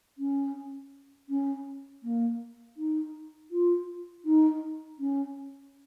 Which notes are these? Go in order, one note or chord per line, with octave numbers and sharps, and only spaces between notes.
C#4
C#4
A#3
D#4
F4
D#4
C#4